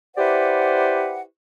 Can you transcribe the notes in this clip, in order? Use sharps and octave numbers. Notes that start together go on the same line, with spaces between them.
E4 G4 B4 C5 D5 F#5